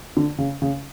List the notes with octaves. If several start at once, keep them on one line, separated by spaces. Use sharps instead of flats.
D3
C#3
C#3